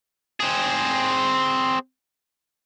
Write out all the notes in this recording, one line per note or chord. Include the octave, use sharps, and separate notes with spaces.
C4 G#4